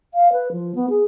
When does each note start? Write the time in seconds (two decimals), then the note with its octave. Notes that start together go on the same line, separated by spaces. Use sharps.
0.14 F5
0.32 B4
0.52 F3
0.75 B3
0.90 G#4